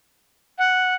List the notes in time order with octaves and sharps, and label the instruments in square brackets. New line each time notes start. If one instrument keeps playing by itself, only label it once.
[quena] F#5